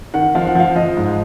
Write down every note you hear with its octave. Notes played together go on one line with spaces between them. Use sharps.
D#3 F#5
F3 F5
F#5
F3 F5
F3 D#5
G#2